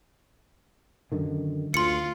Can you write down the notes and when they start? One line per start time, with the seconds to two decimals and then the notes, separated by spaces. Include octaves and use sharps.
1.12 F#2 D3 D#3
1.74 D2 F4 C6 C#7